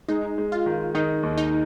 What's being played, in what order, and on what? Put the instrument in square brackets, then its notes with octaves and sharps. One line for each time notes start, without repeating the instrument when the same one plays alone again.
[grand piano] G#3 [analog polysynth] D#4
[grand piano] G#3
[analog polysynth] F4
[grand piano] D#3
[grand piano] D#3 [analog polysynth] D#4
[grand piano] D#2
[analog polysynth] D#4